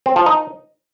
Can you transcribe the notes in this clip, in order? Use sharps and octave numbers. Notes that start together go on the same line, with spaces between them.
C4
F3
D#4